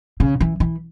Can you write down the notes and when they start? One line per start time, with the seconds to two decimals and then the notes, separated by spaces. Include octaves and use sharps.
0.20 C#3
0.41 E3
0.60 E3